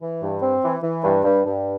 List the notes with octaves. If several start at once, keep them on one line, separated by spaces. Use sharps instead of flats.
E3
G2
C4
E3
E3
G2
G2
G2